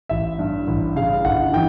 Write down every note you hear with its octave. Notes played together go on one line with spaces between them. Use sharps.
A1 E5
G2
A1
C#3 F5
G1 F#5
E3 G5